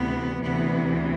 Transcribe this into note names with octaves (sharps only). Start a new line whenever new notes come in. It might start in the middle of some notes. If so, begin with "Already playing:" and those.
Already playing: D2 C3 E3 B3
D2 C3 E3 B3